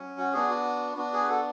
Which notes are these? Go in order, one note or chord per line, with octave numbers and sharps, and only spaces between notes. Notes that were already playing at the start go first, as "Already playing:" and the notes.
Already playing: F#3 C#4
F#4
B3 D4 F#4 G#4
F#4
B3 D4 F#4
G#4
B4
F#4 A4